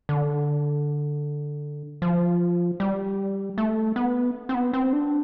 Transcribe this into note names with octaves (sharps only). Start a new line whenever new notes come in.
D3
F3
G3
A3
B3
C4
B3
C4
D4